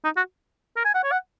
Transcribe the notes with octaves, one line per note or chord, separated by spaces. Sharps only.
D#4
F#4
A#4
G#5
F#5
C#5
F#5